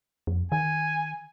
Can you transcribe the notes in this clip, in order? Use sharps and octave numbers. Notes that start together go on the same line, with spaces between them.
F2
D#3 G#5